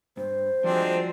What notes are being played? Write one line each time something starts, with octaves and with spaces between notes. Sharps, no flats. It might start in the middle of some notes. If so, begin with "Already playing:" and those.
G2 C5
F3 G3 G#3 C4 D4 F#4